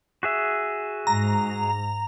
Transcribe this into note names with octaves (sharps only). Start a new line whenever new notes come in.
F#4 G#4 E5
G#2 A#5